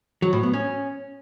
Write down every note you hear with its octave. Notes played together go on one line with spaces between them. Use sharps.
F#3
A2
B3
C#4